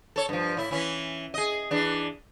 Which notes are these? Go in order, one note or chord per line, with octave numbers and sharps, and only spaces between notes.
A4 C#5
G2 F3
A2 E4
E3 C#4 E4
G#4 D#5
E3 D4